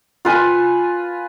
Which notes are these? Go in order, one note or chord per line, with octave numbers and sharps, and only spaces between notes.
F4 B4 G#5